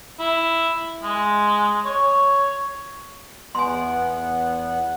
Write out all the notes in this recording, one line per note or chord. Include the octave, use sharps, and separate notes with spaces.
E4
G#3
C#5
E2 B3 F#5 G#5 C6